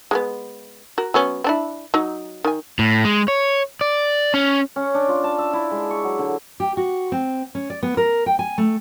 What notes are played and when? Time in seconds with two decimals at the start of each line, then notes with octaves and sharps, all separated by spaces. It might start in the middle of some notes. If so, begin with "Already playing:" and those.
0.11 G#3 A3 B3
0.98 F#4 A#4
1.14 F#3 B3 C#4
1.44 C4 D4 E4
1.94 F#3 D#4
2.44 D#3 G#5
2.79 A2
3.05 G#3
3.28 C#5
3.81 D5
4.34 C#4
4.76 C#4
4.94 D4
5.08 F4
5.24 A5
5.38 E5
5.53 E4
5.71 G#3
5.91 C#6
6.04 F#3
6.19 D3
6.60 G4
6.77 F#4
7.12 C4
7.55 C#4
7.70 D5
7.83 B3
7.97 A#4
8.26 G5
8.39 G#5
8.58 A3